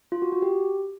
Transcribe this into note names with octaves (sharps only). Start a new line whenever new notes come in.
F4
F#4
F#4
G4